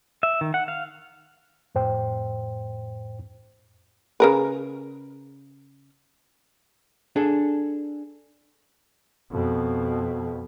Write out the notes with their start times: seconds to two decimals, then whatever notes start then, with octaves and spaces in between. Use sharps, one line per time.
0.23 E5
0.41 D#3
0.54 F#5
0.68 F5
1.75 F2 A2 C5 G5
4.20 C#3 A#4 B4
7.16 D4 G#4 A4
9.31 F2 B2